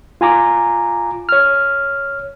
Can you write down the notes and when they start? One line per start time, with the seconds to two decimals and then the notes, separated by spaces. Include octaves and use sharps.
0.21 F4 G#5 A#5 D6
1.29 C#5 F6